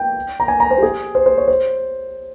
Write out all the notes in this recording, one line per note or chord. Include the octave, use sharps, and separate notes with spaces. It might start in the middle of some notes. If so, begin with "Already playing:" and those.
Already playing: G5
A#5
G#5
A#5
C5
G4
G#4
C5
C5
C#5
C5